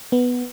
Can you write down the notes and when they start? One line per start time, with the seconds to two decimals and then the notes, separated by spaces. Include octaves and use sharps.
0.12 B3